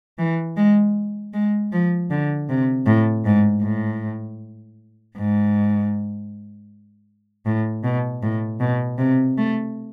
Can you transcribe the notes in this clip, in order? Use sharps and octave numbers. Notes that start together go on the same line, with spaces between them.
E3
G#3
G#3
F3
D3
C3
A2
G#2
A2
G#2
A2
B2
A2
B2
C3
A3